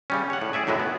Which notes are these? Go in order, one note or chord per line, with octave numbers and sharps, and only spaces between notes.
C#3 G3 C#4
C#5 F#5
A2
G#4 D5 E5 G#5
F#2 A2 F#3 G#3 E4
B3